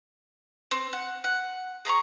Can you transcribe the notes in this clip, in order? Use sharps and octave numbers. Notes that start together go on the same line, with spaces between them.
C4
F#5
F#5
G#4 A#5 B5 C#6